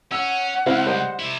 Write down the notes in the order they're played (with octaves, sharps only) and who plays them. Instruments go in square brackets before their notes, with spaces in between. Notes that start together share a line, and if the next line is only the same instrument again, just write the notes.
[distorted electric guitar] C#4 [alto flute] F#5 [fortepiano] E6
[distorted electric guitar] C#2 [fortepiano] C4 E4 F5
[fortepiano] G3 C5 D#5
[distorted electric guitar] C3 E4